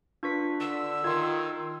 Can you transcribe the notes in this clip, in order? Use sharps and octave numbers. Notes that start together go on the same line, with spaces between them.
D4 F4 B4 C#6 B6
D3 E6
D#3 F4 C6 G#6